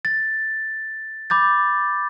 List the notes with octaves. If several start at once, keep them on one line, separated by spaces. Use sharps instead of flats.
A6
B5 D6 G6 A6